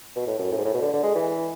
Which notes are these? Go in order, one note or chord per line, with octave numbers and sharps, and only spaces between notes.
B2
A2
F#2
A2
G#2
A2
B2
D3
D3
G#3
E3